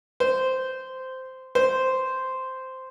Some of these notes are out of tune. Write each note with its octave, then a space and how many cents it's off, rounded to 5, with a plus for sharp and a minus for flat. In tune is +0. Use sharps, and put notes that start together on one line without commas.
C5 -10
C5 -5